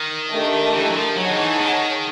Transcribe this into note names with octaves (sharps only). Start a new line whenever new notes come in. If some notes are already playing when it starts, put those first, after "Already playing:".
Already playing: D#3
A3 D4 G4 A#4 D#5
E3
F#3
F3
F#3 D#4 G#4 C#5 F#5 A5
D#3
E3
D#3